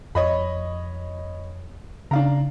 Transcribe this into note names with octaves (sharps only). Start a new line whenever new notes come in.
F2 C#5 D#5 B5
C#3 D4 F5 A#5